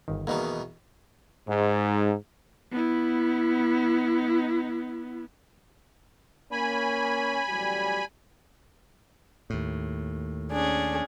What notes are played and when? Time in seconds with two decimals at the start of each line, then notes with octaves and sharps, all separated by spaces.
0.08 G1 D#3
0.27 E2 B2 D#3 A#3 D#4
1.48 G#2
2.71 B3 E4
6.52 A#3 C#4 G#5 B5
7.49 A1 F#3 G3
9.50 D#2 A2
10.50 C#4 D4 G#4